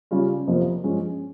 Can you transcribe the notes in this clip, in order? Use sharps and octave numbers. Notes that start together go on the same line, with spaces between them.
C#3 G3 C#4 F4
F2 C3 F3 A#3
G2 F3 G#3 C#4